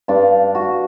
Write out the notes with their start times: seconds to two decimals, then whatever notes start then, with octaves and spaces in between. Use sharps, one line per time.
0.08 G2 D4 D5 F5
0.55 F#4